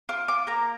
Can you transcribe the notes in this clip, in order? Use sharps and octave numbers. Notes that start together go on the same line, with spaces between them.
F4 D6
D6
A#3 A#5